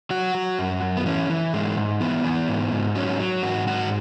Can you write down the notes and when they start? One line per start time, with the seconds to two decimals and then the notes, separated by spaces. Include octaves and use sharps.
0.11 F#3 F#4
0.35 F#3
0.59 F#2
0.82 F#2
0.97 B3
1.06 E3 C#4
1.30 E3
1.53 G#2 G#3
1.77 G#2
2.01 E3 B3
2.25 E3
2.48 G#2
2.72 G#2
2.95 F#3 C#4
3.19 F#3
3.43 G#2 F#4
3.67 G#2 F#4